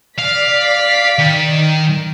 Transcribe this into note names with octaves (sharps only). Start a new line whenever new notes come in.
D5 F5 B6
D#3